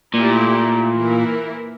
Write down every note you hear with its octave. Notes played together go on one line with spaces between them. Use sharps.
A#2 A3 E4 G4
E3 A#3 E4 A#4